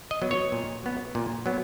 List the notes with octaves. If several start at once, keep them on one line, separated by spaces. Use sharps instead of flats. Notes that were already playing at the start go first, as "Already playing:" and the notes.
D#5
F#3 B3
C#5
A#2
F#3 B3
A#2
F#3 B3